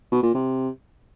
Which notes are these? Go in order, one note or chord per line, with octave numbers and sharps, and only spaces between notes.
B2
A#2
C3